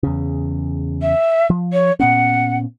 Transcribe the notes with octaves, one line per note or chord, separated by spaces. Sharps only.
E2 C#3
E5
F3
C#5
A#2 B3 C#4 F#5